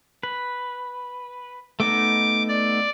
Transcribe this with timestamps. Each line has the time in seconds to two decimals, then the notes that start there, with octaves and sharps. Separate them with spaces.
0.23 B4
1.80 A3 B3 D#4 D6
2.49 D5